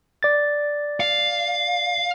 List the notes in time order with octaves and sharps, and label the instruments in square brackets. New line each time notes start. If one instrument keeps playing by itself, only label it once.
[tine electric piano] D5 A6
[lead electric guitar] F5